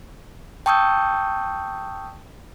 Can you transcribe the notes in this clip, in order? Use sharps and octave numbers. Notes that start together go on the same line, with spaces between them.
G5 A5 C#6 D#6 E6 G6